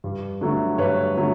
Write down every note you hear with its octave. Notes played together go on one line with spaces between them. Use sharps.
G2
D3 F#3 A3
G2 B4 C#5
D3 F#3 A3